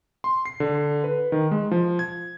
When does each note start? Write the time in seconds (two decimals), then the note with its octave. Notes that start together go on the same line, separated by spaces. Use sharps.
0.24 C6
0.46 C7
0.60 D3
1.04 B4
1.32 D#3
1.51 G#3
1.71 F3
1.99 G#6